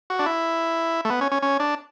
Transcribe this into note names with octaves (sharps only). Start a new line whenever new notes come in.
F#4
D4
E4
A3
B3
C#4
C#4
C#4
D4